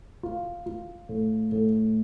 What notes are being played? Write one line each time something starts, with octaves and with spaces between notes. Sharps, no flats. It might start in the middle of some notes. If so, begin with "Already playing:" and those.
F4
F4
A2
A2